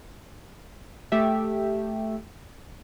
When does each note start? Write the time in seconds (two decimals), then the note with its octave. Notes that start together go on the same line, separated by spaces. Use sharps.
1.12 A3 G4 E5